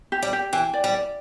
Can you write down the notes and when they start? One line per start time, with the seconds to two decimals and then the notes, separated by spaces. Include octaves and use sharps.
0.12 G4
0.22 G3
0.33 G4
0.53 E3 G5
0.73 D5
0.84 G3
0.94 D5